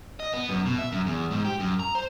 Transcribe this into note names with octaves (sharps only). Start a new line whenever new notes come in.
D#5
B3
F#2
B2
E5
F#2
E2
G#2
G4
F#2
A#5
C5